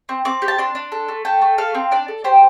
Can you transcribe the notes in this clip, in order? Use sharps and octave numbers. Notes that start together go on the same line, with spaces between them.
C4
C4 D6
G4
A5
D4 C6
D4
A4
A3
A4 G5
A3
A4 F5
C4
D4 D5
A4
G4 C5